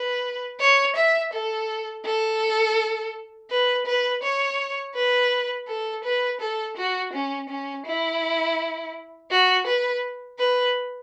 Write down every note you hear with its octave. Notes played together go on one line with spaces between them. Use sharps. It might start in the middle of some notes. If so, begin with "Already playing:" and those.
Already playing: B4
C#5
E5
A4
A4
B4
B4
C#5
B4
A4
B4
A4
F#4
C#4
C#4
E4
F#4
B4
B4